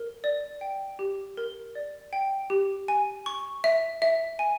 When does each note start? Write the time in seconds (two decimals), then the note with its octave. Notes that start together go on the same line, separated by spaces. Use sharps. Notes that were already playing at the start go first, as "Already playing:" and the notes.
Already playing: A#4
0.24 D5
0.61 G5
0.99 G4
1.37 A#4
1.75 D5
2.13 G5
2.50 G4
2.88 G#5
3.26 C#6
3.64 E5
4.02 E5
4.39 G#5